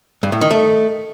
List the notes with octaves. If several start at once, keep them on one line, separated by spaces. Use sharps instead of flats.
G2
A2
D#3
A3